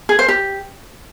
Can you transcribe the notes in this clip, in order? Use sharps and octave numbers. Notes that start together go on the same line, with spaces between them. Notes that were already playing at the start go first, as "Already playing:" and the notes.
G#4
C5
G4